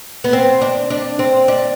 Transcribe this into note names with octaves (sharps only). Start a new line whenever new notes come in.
B3
C4
D4
D4
C4
D4